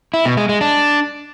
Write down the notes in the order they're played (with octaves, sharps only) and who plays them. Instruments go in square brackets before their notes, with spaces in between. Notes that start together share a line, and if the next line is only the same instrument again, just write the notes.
[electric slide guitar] E4
B2
G#3
G#3
D4